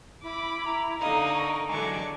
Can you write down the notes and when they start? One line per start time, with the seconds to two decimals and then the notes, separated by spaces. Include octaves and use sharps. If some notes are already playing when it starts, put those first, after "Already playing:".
0.23 E4 B5 D6
0.66 E4 A#4
1.01 D3 D#4 D#5 F5
1.33 C#6
1.69 D3 E3 F#3 G#3 A5 C#6 D6